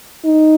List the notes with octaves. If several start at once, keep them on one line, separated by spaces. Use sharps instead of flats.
D#4